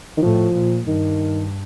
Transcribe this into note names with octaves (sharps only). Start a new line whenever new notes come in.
D#3
A2 F3
A#2
G2 D#3